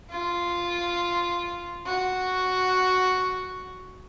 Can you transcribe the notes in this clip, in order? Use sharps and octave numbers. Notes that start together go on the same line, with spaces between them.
F4
F#4